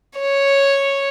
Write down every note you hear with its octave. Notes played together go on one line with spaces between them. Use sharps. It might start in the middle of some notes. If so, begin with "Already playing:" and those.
C#5